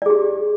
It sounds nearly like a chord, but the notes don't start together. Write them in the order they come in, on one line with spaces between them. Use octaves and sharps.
D5 G#4 G4